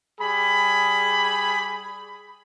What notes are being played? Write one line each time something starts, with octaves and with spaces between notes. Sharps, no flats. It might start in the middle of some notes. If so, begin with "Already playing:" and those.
G3 G#4 B5